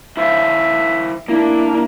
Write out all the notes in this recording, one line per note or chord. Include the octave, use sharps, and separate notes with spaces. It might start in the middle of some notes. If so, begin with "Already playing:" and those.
E4 C5 E5 F5
A#3 D4 E4